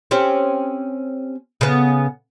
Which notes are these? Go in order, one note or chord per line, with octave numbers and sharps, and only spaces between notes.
C4 C#4 G4
C#3 B3